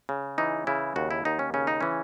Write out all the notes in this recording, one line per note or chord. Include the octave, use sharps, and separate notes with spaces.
C#3
E3 D#4
C#3 E4
D#2 F#4
E4
D#2 D#4
C#4
C#3 C#4
D#4
E3 C#4